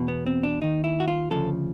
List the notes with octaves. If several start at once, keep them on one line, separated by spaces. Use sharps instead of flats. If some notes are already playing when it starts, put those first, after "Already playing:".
Already playing: E2 B2
B3
C4
D4
D#2 D#3 D#4
E4
F#4
F4
D2 C#3 F3 A4